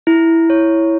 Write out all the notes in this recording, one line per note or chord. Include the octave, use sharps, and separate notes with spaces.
E4
C#5